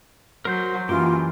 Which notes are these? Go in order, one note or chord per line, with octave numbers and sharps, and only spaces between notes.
F#3 A#4 C5 G6
F#2 E3 A#3 F4 G4